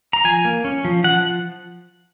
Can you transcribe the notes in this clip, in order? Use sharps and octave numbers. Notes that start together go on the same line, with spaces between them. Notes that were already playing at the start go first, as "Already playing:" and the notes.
A#5
F3 G#5
A#3
C#4
F3
F3 F#5